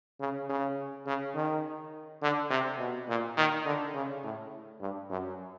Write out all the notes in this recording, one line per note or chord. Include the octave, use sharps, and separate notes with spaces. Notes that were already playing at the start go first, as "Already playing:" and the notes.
C#3
C#3
C#3
D#3
D3
C3
B2
A#2
D#3
D3
C#3
A2
G2
F#2